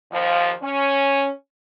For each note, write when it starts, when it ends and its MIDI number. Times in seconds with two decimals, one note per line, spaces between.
0.12 0.53 39
0.12 0.53 53
0.63 1.29 61